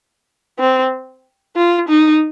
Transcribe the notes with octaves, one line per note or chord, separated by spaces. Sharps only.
C4
F4
D#4